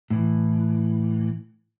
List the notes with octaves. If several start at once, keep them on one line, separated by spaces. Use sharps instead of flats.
A2 E3